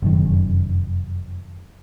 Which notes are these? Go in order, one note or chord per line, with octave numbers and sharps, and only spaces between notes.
F1 F#2 D#3